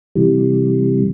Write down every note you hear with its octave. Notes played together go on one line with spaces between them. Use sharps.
C3 E3 G3